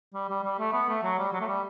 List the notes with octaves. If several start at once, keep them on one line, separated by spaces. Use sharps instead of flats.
G3
G3
G3
A3
B3
A3
F#3
G3
F#3
A3
G3